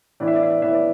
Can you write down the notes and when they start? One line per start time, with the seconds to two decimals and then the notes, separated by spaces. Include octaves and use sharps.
0.20 A2 E3 B3 D5
0.28 E5
0.35 D5
0.43 E5
0.50 D5
0.62 A2 E3 B3 E5
0.73 D5